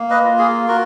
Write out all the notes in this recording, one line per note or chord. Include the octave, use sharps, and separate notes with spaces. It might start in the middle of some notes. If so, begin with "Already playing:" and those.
Already playing: A#3
B4 D#5
F4
G#4
F#4 A#4